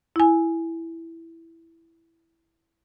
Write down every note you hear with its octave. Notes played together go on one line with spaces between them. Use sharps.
E4 G#5